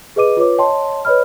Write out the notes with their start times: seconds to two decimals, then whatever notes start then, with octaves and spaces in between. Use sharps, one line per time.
0.16 G#4 B4 D#5 D6 D#7
0.37 F4 B4 C#5 D6
0.58 C#5 D#5 G5 A5 C6
1.05 B4 C#5 D#5 B5 F6